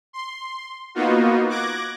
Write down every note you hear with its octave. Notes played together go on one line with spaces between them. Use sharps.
C6
A#3 B3 D#4 F4 F#4
D6 F#6 G#6 A#6